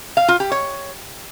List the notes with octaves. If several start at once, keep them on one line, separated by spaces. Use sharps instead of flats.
F5
F4
G4
C#5